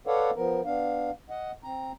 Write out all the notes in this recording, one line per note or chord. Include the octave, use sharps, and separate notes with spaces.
A4 B4 C#5 D5 F5 F#5
F3 B3 A#4
B3 D4 F5
D#5 F#5
C4 A#5